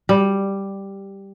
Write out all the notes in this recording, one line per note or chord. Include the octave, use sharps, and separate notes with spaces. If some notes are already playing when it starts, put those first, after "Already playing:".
G3